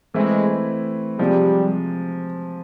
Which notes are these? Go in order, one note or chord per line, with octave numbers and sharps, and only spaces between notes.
E3 G#3 A3 C4 E4
C3 F3 G3 G#3